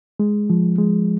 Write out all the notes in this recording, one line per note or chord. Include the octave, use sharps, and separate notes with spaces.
G#3
F3
G#3